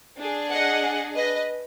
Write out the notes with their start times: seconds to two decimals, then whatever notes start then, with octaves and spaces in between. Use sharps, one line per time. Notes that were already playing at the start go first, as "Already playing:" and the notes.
0.18 D4 G#4
0.50 D#5 F#5
1.15 B4 D#5